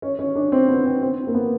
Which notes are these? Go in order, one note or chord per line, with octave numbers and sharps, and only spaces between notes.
C#4
C#4
D4
C4
B3
C4
C4
A#3
B3